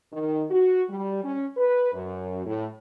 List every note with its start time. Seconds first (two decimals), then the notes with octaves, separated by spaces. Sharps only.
0.12 D#3
0.50 F#4
0.89 G3
1.24 C#4
1.57 B4
1.93 F#2
2.46 A2